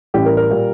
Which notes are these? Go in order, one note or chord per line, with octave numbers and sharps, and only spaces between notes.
A1 A2 G3 G4
A#4
A#4
A#2 G3